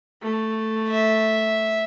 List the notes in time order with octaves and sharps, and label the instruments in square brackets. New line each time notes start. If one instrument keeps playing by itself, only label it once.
[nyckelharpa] A3
[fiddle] E5